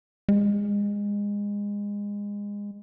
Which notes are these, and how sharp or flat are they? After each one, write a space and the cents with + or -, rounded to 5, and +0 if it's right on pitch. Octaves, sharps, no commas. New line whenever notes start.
G#3 -25